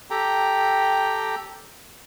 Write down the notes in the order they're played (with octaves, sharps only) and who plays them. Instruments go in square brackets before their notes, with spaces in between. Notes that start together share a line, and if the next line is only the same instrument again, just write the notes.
[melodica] G4 A4 G5 A#5